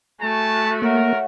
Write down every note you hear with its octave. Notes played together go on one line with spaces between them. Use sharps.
A3 F#4 G#5 A5
A#3 A#4 C#5 E5 F#5